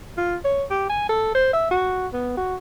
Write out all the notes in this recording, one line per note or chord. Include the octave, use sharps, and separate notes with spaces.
F4
C#5
G4
G#5
A4
C5
E5
F#4
B3
F#4